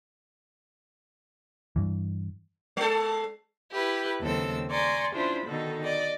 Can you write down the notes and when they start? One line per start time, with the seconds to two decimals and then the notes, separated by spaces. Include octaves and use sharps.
1.76 G2 E3
2.77 G#3 A4
3.73 E4 G4 B4
4.21 D#2 C#3 F#3 C4 A4 E6
4.71 D5 G#5 A#5 C6 C#6
5.14 C#4 D4 E4 F4 C5 B5
5.46 B2 D3 D#3 D#4 A4
5.82 D5 D#5